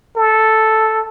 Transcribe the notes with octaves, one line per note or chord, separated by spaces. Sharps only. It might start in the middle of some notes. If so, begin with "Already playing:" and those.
A4